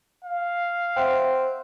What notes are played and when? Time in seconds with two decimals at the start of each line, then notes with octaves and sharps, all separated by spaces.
0.25 F5
0.96 C4 E5 F#5 G5